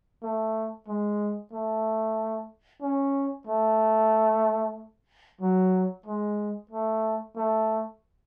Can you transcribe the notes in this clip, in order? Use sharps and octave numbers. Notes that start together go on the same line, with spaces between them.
A3
G#3
A3
C#4
A3
F#3
G#3
A3
A3